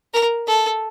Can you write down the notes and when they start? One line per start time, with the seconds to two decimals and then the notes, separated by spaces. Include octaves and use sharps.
0.14 A#4
0.48 A4